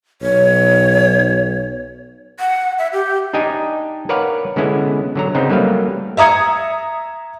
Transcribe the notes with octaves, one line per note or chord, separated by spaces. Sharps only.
B1 C#5
F#5
E5
G4
D4 D#4 G4 D#5 G#5
A#4 B4 C#5 D5 F5 F#5
D3 G#3 B3 C#4 E4
D3 F#3 A#5
C#3 B3 C4 D#4
F#3 G3 A3 A#3 B4 F5
E5 A#5 D#6 G#6 C#7